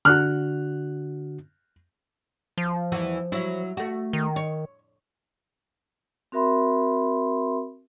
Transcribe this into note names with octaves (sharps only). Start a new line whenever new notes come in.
D3 D4 F#4 F6 F#6
F3
E2 E3 F#4
F#3 E4
A3 F#4
D#3
C#5
C4 F#4 A#4 E5 B5 C6